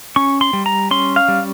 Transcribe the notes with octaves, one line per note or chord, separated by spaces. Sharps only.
C#4 C#6
C6
G3
A#5
C#4 C6
F5
G3